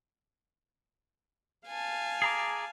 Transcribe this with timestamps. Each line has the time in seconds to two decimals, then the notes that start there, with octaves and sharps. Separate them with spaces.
1.67 F5 G#5 A5
2.22 G#4 A#5 D6